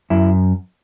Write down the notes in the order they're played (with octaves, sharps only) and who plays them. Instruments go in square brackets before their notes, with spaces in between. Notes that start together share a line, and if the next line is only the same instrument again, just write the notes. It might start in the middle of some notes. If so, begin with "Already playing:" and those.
[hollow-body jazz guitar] F#2 E4